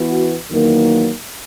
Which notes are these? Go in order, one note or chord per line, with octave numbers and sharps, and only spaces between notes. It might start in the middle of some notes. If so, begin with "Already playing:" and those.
Already playing: E3 B3 F#4
E2 D#3 F#3 A#3